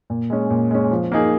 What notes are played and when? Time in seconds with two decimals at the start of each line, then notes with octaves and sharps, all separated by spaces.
0.10 A#2
0.30 G#3 C#4
0.50 A#2
0.71 G#3 C#4
0.91 F3
1.12 A#3 D#4 G#4